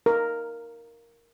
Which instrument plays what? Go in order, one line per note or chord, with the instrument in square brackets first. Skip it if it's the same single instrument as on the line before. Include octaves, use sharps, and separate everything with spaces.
[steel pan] A#4